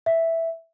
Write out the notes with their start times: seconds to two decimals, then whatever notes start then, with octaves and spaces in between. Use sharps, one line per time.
0.06 E5